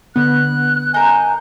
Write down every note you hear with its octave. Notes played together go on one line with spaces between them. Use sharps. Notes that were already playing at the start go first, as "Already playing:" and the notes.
D3 B3 F#6
D#4 A#4 G#5 G6